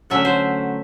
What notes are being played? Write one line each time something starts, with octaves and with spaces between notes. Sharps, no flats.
D3 F#3 A3 C#4 E5
C5